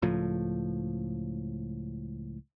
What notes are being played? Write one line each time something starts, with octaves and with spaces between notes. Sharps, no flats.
C#2 A2 F3